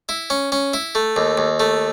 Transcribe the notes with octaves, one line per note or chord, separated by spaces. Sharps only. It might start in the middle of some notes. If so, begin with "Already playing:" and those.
E4
C#4
C#4
E4
A3
D#2
D#2
A3